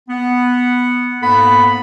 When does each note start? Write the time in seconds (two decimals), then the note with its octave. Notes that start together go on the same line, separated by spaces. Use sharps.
0.09 B3 F#5
1.22 G#2 A#3 B3 A4 F#5 B5